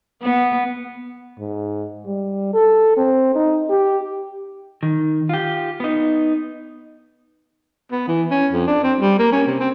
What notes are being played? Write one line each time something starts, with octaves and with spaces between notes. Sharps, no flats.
B3
G#2
G3
A4
C4
D#4
G4
D#3
F4 G4
B3 D#4
B3
E3
C#4
F2
D4
C4
G3
A#3
C#4
C3
C4